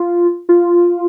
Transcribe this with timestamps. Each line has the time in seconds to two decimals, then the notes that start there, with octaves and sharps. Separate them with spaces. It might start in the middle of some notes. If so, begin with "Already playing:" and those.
Already playing: F4
0.49 F4